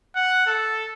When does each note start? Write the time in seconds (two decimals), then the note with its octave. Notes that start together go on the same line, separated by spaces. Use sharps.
0.16 F#5
0.46 A4